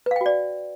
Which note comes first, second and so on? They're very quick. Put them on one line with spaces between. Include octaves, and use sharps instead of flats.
B4 F5 G5 F#4 D5